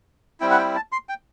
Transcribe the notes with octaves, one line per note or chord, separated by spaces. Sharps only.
G3 C4 E4 G5
F#5
G5
A5
C6
G5